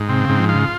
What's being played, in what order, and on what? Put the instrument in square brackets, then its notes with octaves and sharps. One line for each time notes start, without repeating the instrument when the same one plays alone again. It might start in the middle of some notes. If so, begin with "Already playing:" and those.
Already playing: [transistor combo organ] G#2
[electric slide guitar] C3 [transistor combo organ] C4
[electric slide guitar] C#3
[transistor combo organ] G#2
[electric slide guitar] F3
[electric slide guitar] C#3 [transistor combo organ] F4